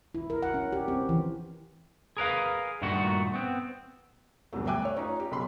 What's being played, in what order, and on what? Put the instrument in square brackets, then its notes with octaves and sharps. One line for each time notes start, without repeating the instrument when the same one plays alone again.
[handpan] E4
A#4
F#5
C#4
G4
C4
E3
[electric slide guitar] G#4 A#4 B4 F5
G2 A#2 D#3 A3 F#4
B3 C4
[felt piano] D2 G2 B2 F#3 A3
E5 G5 G#5 D6 F#6
A3 C#5
C#4 D#4 F4
G4
B1 C#3 B5 C6